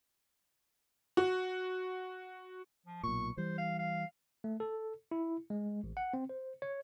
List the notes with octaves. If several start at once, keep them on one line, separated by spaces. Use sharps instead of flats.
F#4
F3
B1 A#2 C#6
E3 G3 C5
F5
F5
A3
A4
E4
G#3
A1
F#5
C4
C5
C#5